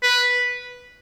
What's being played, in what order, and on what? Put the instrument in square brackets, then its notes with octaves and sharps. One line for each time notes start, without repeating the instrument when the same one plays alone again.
[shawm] B4